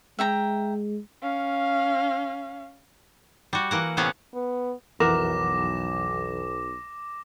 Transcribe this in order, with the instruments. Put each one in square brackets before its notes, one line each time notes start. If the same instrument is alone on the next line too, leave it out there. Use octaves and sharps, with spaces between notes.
[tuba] G#3 [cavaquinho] E5 G5 A#5
[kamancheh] C#4 F5
[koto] G3 F#4
E3 A#3 F#5
A2 C3 B3 C#4 F5 F#5
[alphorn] B3
[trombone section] B1 [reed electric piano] F2 E3 F#5 [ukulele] A#4 [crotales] D6 A#6 E7